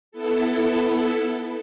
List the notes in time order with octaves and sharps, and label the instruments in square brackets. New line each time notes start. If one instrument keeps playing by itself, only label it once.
[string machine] B3 E4 A4